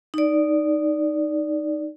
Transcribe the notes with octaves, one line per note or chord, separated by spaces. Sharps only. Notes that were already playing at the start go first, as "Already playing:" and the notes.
D#4 D5